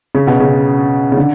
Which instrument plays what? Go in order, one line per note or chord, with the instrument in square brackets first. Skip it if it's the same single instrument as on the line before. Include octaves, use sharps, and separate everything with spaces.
[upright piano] C#3
B2
C#3
C#3
D3